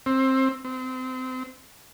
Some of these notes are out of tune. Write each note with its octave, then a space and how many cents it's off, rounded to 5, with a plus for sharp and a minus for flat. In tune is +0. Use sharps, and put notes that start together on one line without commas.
C4 +20
C4 -25